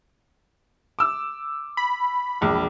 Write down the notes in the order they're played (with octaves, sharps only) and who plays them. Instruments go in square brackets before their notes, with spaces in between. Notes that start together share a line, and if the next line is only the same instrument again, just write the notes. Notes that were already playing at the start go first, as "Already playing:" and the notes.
[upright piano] D6 E6
[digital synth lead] B5
[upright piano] E1 A#1 D6